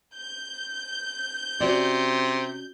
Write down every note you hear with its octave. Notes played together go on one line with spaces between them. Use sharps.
G6
C3 C#4 F#4 D5